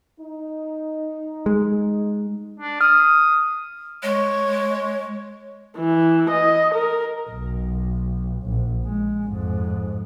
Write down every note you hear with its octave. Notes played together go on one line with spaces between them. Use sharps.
D#4
G#3
D4
D#6 F6
G#3 C#5
E3
D#5
A#4
B1
A#1
G#3
F2 G#2